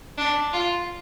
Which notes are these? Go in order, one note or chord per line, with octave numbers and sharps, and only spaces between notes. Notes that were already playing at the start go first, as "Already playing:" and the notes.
D4
F4